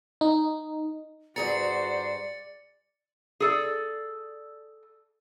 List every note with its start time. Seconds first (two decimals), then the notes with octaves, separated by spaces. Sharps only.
0.21 D#4
1.36 G2 F#4 G#4 C5 D5 A#5 A6 C#7
3.40 G#4 A4 D5